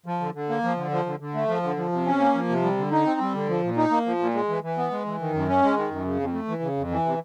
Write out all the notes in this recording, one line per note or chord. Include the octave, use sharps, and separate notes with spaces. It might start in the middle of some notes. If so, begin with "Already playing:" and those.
F3
D3
D3
A#3
F3
D3
F3
D3
D3
A3
F3
D3
F3
C3
C#4
A#3
F3
C3
G3
D3
D#4
C4
G3
D3
F3
A#2
D#4
A#3
F3
A#2
G#3
E3
E3
B3
G#3
E3
D#3
F#2
C#4
G#3
D#3
F#2
C#3
F2
A3
E3
C#3
F2
E3
C3